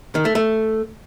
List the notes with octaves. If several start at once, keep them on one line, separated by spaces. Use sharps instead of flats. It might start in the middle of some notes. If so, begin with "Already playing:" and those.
D#3
A3
A3